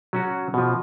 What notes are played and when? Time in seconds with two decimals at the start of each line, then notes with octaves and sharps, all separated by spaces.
0.13 F#3 C#4 F#4
0.54 B2 F3